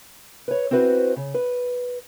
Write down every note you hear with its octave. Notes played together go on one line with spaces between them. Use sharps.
B4 C#5
C4 E4 F#4 B4 C5
C#3
B4